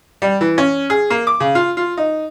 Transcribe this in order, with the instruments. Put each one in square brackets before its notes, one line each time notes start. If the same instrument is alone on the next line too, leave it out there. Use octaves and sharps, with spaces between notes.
[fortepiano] G3
E3
C#4
G#4
A#3
D6
C#3
F4
F4
D#4